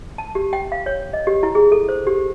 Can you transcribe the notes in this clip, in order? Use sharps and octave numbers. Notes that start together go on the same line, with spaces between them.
A5
G4
G5
F5
C#5
D#5
G4
E4
G#4
A4
C5
G4